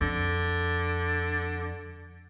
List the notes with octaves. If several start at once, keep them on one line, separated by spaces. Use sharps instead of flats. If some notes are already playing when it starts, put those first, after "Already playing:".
F2 D3